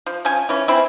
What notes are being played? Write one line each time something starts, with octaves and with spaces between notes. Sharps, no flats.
F3
F3 C#4 G#5
E3 C#4
C4 E4